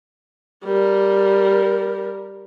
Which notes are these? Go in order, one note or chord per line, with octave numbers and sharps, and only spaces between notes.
G3 A#4